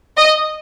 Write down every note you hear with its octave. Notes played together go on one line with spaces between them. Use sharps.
D#5